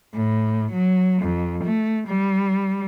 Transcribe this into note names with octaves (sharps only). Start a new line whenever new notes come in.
A2
F#3
F2
A3
G3